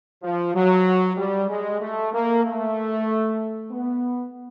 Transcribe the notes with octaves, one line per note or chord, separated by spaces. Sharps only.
F3
F#3
G3
G#3
A3
A#3
A3
B3